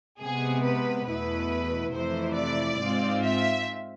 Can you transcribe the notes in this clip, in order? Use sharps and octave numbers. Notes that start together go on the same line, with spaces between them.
C3 G#3 B3 G#4
B4
E2 B2 A3 E4 B4
F2 C3 E3 A3 E4 C5
D5
G#2 G#3 C4 F4
E5